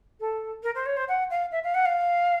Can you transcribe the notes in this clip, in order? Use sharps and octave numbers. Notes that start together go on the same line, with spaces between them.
A4
A#4
C5
C#5
C5
F#5
F5
E5
F5
F#5
F5